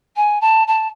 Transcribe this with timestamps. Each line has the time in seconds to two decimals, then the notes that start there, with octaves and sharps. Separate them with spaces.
0.16 G#5
0.41 A5
0.67 A5